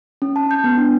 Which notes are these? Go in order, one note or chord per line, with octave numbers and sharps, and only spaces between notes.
C#4
A5
G6
B3
D4